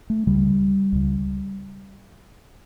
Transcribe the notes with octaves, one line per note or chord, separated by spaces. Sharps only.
A3
C#2 C#3 G3
C#2 C#3